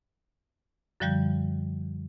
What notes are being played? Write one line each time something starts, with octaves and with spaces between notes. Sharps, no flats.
F#2 D3 F3 G3 G6